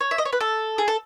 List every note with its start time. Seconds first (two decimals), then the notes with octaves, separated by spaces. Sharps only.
0.01 C#5
0.11 E5
0.18 D#5
0.25 C#5
0.33 B4
0.41 A4
0.78 G#4
0.88 A4